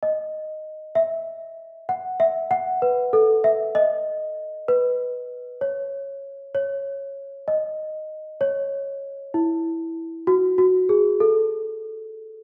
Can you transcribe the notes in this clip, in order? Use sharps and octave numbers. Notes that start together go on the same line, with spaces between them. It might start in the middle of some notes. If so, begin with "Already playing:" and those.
D#5
E5
F#5
E5
F#5
B4
A4
E5
D#5
B4
C#5
C#5
D#5
C#5
E4
F#4
F#4
G#4
A4